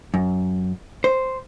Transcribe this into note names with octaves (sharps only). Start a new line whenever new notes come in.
F#2
C5